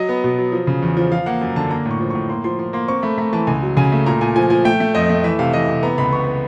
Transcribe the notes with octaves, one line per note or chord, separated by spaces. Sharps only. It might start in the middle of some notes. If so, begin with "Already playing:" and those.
Already playing: F#3 D#5
B3
B2
F#3
F3
C#3
E2
F3
F3 F5
A#3 F#5
F#2
D3 A5
A#3 A#5
A2
C#6
F3
A2 C#6
A#3 C6
F3 C6
F3 C6
A#3 C6
C4 C#6
A3 B5
A3 A#5
E3 A5
C#2 G#5
F#3
C#3 G#5
A3
A#2 A#5
A#2 G#5
F3 G#5
F3 G#5
A3 G5
A3
F2 D#5
A3
E3 E5
C3 F5
E3 D#5
C3
B3 A#5
C#2 B5
B3 C#6
B3